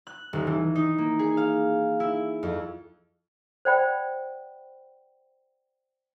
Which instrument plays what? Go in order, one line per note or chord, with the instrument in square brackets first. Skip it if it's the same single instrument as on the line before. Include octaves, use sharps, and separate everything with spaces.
[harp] F#6
D#1
E3
D#4
A#3
G#4
F5
E4
F2
[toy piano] C5 D5 F#5 G5 B5